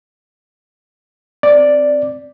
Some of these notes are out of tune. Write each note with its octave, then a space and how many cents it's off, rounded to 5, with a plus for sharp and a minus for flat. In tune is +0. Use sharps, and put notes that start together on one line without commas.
C4 +0 D5 +0